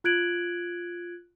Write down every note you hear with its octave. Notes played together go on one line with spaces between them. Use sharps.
F4 F#6 G#6 D7 F#7